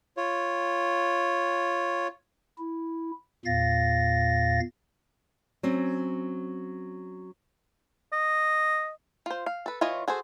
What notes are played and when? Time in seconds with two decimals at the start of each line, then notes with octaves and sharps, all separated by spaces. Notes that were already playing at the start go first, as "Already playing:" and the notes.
0.17 F4 C#5
2.58 E4
3.45 E2 A#2 F5 A6 A#6
5.63 F#3 C4 C#4
8.12 D#5
9.26 F4 C5
9.46 F5
9.66 A4 B4
9.81 E3 F4 C#5 D#5
10.08 F#4 G#4 A4 C5